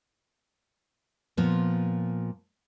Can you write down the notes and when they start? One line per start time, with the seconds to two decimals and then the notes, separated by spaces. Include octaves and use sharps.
1.37 A#2 F3 B3